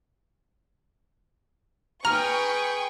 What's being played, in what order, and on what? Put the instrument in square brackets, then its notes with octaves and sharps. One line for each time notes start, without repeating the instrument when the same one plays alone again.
[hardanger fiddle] G#4 B4 [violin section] G5 C#6 [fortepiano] A#5 [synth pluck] F6